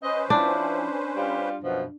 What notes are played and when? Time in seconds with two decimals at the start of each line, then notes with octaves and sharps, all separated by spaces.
0.03 C#4 B4 C5 D#5
0.30 F3 D4 E4
1.17 G3 F4 G4
1.63 F#2 B2 F3